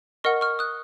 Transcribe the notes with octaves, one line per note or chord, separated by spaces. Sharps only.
A#4 D#5 F#5 C#6 F6
C#6 F6
D#6 F#6